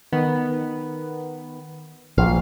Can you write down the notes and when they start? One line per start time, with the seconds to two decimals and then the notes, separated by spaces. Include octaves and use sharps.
0.12 D#3 B3
2.18 A#1 F5